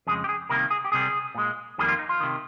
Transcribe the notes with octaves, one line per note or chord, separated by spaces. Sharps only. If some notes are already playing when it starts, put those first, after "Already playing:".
F2 C#3 G#3 G#4
G4
G#4
C2 C3 D#3 A#3 A#4
G#4
G4
C2 C3 G3 G#4
A#2 G#3
F2 D#3 G3 A#3 G#4
F4
D#4
F4
C3 D#3